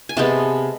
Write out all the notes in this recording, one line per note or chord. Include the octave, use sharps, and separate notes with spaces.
G#5
C3 G#3 B3 A4 A5